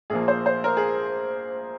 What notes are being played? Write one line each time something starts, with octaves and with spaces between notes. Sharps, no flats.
A#1 A#2 F3 A#3 G#4
C5
C5
A#4
G#4